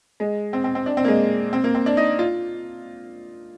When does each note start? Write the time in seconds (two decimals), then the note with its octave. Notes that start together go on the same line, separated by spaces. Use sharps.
0.20 G#3
0.53 C4
0.64 C4
0.75 C4
0.86 D4
0.97 C4
1.05 A#3
1.08 G#3
1.53 C4
1.64 A#3
1.75 C4
1.86 D4
1.97 D#4
2.19 F4